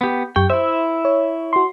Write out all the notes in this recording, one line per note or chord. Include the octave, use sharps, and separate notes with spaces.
B3 G4
F#2 G4 G5 C#6
E4 C5 E5
C#5
F#4 C6